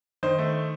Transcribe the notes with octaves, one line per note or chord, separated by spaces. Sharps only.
D#3 C5
A3